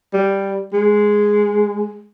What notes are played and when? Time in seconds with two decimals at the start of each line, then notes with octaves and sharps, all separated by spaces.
0.14 G3
0.73 G#3